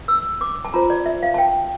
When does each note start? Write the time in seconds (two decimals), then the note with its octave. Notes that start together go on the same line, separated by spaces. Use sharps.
0.08 E6
0.41 D6
0.65 A5
0.74 F4 C5 A#5
0.90 D5
1.06 E5
1.23 F5
1.34 A5
1.38 G5